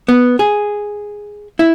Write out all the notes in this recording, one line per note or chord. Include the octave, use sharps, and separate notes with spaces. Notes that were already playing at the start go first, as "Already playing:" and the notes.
B3
G#4
E4